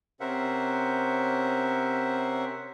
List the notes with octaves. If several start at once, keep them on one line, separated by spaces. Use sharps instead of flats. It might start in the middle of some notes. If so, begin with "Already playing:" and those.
C3 C#4 A#4 C5 E5 F#5